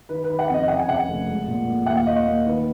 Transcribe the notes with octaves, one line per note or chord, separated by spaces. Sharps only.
D#3 B4
B4
D#3
F#5
F2 D#5
C#3 F#5
G#5
C#3 F#5
F1
G#3
A#2
A#2
D#2 F#5
F5
A#3 D#5
F5
A#3
D#3 B4